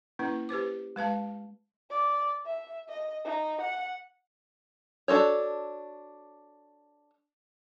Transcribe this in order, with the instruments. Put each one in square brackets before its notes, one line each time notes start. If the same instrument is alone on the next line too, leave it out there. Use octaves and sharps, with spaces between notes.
[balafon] A#3 C#4 E4 B4
G4 B4 C5 D6
G#3 B4 F5 A5
[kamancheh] D5
E5
D#5
D#4
F#5
[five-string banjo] D4 F#4 A4 C#5